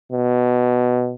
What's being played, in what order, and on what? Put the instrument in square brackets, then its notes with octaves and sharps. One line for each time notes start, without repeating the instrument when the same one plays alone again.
[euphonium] B2